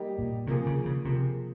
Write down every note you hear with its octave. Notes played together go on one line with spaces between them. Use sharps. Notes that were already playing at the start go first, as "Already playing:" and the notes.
Already playing: G3 A#3 D#4 G4
A#2
C3 F3 A#3 F4 G#4
C#3
C#3
C3 F3 A#3 F4 G#4